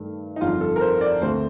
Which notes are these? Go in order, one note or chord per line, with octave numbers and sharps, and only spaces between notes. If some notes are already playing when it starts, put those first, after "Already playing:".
Already playing: G2 D#3 A3
D#4
G1 F2 D3 F4
A4
A#4
C5
D5
D2 D3 A3 C4 C5